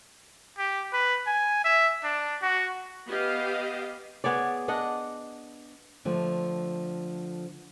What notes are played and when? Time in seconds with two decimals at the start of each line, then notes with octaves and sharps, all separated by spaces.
0.58 G4
0.93 B4
1.27 G#5
1.64 E5
2.04 D4
2.42 F#4
3.08 B3 G4 D#5 F5
4.24 B3 G#4 C#5 D5
4.68 D4 D#5 F#5
6.05 D3 F3 A3